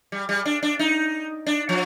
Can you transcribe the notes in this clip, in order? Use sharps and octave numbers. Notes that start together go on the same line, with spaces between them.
G3
G3
D4
D4
D#4
D4
F3